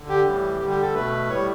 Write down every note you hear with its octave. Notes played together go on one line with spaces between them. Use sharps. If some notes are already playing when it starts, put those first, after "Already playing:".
Already playing: D3
G4
A2 E3 G3
D3 G3
G4
A4
B2 A3 B4
A2 G3 C#5